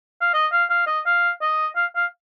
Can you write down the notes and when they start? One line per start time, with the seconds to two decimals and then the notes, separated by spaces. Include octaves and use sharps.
0.21 F5
0.34 D#5
0.52 F5
0.70 F5
0.87 D#5
1.06 F5
1.41 D#5
1.76 F5
1.96 F5